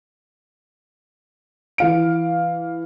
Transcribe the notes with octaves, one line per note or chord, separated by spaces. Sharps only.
E3 F5 D7